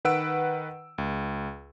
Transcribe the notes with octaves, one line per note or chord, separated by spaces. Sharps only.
D#3 B4 F#5 E6 D7
C#2